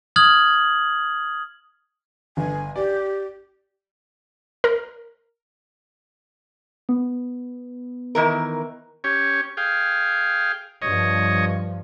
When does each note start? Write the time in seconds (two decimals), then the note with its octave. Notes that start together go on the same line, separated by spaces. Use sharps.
0.16 D#6 F6 G#6 F#7
2.37 G1 G#5
2.76 G4 D5
4.64 A#4
6.89 B3
8.15 D#3 E3 A#4
9.04 C#4 G4 C#5
9.57 G#4 F5 G5
10.82 G2 F3 C#5 D#5